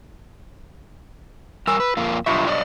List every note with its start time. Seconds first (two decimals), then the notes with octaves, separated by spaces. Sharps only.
1.67 G3 A#4 G#5 E6
1.80 B4
1.97 F2 A#3 F4
2.26 B1 G2 D3 F4 E5 C#6
2.47 D5 D#5